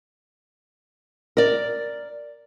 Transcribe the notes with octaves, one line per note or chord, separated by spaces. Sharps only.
A#4 D5